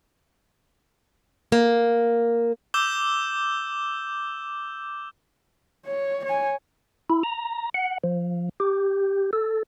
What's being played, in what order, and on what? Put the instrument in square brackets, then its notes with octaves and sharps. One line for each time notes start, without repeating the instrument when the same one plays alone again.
[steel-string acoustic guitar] A#3
[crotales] D6 E6 G6 E7 G7
[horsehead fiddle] C#5
C#5 G#5
[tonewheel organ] E4
A#5
F#5
F3
G4
A4